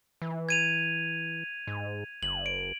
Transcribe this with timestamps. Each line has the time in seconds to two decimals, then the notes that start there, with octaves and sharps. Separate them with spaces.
0.22 E3
0.49 G#6 D#7 F7
1.67 G#2
2.23 F#1 F#7
2.46 D7